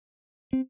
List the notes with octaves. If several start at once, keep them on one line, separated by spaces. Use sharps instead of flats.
C4